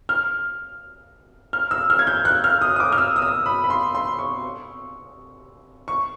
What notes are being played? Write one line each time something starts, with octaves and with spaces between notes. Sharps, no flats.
F6
F6
E6
F6
G#6
G6
F#6
F6
D#6
D#6
D6
F6
E6
D#6
E6
B5
B5
C6
C6
C#6
C#6